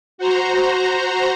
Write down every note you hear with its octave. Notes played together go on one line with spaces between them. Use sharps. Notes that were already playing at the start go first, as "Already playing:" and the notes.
F#4 C5 A#5